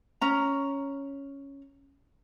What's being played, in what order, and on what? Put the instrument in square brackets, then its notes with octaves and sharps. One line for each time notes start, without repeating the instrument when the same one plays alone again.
[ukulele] C#4 A#5